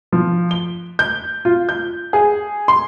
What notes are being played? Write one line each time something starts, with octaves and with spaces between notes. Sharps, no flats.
F3
G7
G6
F4
G6
G#4
C6